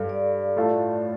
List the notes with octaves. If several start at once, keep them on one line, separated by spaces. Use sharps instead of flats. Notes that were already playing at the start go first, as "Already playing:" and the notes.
Already playing: G2 A4 F5
D5
A2 A3 F4 A4